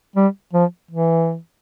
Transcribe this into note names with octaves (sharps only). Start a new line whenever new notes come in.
G3
F3
E3